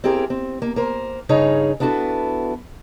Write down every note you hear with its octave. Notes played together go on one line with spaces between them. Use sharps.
C4 E4 G4 G#4 A#4
C4
A#3
A#3 A#4 C5
G2 C#3 D#4 G#4 C#5 A#5
B3 D4 E4 F#4 G#4 A4